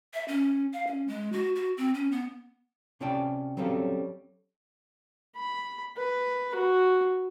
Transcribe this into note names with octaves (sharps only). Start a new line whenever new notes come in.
E5
C#4
F5
C#4
G#3
F#4
F#4
C4
C#4
B3
C3 C#4 F4 D5 G5 A5
F#3 G3 C4 C#4 A4 F5
B5
B4
F#4